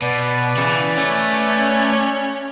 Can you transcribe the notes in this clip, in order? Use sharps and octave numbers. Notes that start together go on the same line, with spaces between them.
B2 B4 D5
C#3 E3
A3 C#4